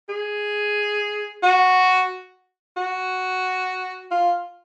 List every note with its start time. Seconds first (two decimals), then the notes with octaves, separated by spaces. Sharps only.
0.09 G#4
1.43 F#4
2.77 F#4
4.11 F4